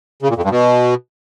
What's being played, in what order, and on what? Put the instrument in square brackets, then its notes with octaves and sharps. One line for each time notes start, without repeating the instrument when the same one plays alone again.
[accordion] C#3
A#2
F2
G2
B2